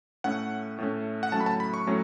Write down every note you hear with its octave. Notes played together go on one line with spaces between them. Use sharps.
A2 A3 C#4 F#5
A2 A3 C#4
F#5
A2 F#3 A3 C#4 A5
B5
A5
B5
C#6
A2 F#3 A3 C#4